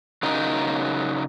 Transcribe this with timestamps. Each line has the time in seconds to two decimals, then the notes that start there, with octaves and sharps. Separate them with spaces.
0.23 C#3 F#3 D#4 A#4